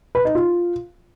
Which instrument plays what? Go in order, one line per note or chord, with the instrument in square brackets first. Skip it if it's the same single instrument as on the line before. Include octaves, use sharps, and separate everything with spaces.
[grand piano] B4
D#4
F4